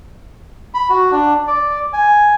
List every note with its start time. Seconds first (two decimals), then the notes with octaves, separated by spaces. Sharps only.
0.74 B5
0.90 F#4
1.11 D4
1.47 D5
1.93 G#5